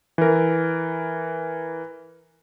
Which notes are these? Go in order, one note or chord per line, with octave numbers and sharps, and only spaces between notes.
E3 A#4